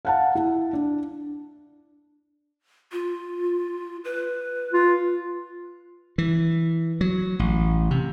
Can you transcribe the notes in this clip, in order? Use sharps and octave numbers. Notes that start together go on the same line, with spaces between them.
F5 F#5 A5
E4
D4
F4
B4
F4
E3
F#3
A1
C3